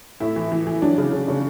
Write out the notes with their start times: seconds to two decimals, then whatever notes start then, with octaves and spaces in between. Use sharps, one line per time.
0.20 A2 E4
0.36 E3
0.52 E3
0.67 E3
0.82 F#3 D4
0.98 C#3
1.13 C#3
1.28 C#3